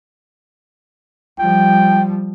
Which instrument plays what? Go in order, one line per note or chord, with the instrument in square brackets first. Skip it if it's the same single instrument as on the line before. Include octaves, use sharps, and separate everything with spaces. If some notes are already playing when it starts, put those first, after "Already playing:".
[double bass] F3 G3 [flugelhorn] G5